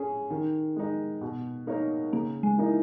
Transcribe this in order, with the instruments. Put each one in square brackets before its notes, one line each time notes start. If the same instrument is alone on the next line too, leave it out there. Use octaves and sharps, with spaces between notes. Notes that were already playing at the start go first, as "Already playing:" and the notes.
Already playing: [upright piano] C#4 G#4
D#3
G#3 D#4
B2
A#3 D#4 A#4 C#5
[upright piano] C#3 [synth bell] A#3
[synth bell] G#3
[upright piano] E3 A#3 D#4